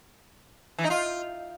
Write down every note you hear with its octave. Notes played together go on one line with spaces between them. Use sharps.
E3
D#4
F4